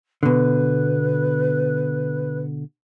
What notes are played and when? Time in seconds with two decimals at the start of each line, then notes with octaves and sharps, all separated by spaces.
0.23 B2 D3 B4